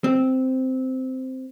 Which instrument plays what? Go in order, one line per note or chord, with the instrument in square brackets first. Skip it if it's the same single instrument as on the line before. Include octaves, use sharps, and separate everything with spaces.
[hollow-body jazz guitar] C4